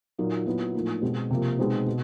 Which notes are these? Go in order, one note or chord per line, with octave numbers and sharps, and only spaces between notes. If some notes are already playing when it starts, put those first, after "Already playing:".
A#2 F#3 A#3 D#4
A#2 F#3 B3 E4
A2 F3 A#3 D#4
B2 G#3 C4
C3 F3 A#3
B2 G#3 C4 D#4
B2